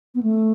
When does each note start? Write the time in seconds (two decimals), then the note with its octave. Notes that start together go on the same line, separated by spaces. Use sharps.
0.15 B3
0.23 A3